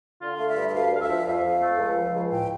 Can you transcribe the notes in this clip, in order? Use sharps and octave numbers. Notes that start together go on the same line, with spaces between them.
D3 F4
A3 F5
E5
G2
E5
D2 F5
D2 F5
E5
F3
F2 F5
F2
A3
C#2
F3
C#2
A2 G5